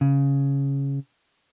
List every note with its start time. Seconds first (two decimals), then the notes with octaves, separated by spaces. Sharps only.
0.01 C#3